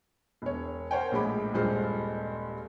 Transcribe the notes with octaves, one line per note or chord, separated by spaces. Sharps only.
E1 C#5
A#4 C5 C#5 F#5 G5
A#1 A2 G#3 B5 D6
D#1 G2 G#3 F4 C5 F6